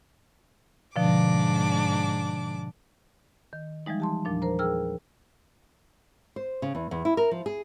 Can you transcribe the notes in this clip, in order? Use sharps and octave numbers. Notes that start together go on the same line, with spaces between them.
G#2 B2 D3 F3 D4 D6
D#3
E3 F3 G3 G#3 D#4
G4 A5 C6
E2 A#2 F3 D4
A#4 C5 A#5
G#4 A#4 G5 E6 F6
C5
C#3
E2
E2
E4
A#4
F3
G#4